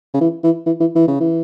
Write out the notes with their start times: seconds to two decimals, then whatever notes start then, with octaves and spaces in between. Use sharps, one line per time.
0.14 C#3
0.21 E3
0.44 E3
0.66 E3
0.80 E3
0.95 E3
1.07 C#3
1.20 E3